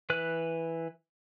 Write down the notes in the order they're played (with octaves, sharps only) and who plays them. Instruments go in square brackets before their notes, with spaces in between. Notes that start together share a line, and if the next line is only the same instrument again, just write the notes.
[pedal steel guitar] E3 B4 F#6